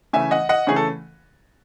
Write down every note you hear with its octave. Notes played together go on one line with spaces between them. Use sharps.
C#3 E3 A3 C#4 E5 G#5
D#5 F#5
D#5 F#5
C#3 E3 A3 C#4 G#4
A4